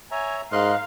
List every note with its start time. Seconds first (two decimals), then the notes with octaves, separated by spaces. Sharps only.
0.11 C#5 E5 G#5 A#5
0.52 G#2 A#4 D#5 F5 C6 F#6